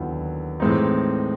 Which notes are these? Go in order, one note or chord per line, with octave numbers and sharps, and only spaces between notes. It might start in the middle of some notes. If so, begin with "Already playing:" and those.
Already playing: D#2 D3 F#3 B3 E4
A2 E3 G#3 C4 D#4